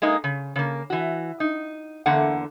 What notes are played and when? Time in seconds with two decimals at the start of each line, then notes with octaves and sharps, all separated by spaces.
0.02 G#3 A#3 D#4 D#5
0.24 C#3
0.56 C#3 A#3
0.90 E3 F#4
1.40 D#4
2.06 E2 D3 A#3 F#5